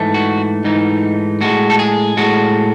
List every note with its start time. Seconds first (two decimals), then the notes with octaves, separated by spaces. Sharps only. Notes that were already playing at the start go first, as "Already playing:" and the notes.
Already playing: G#2 E3 A3
0.14 F#4
0.64 G#2 E3 A3 D#4
1.41 A2 G#3 F#4
1.70 A4
1.79 G#4
2.17 A2 G#3 F#4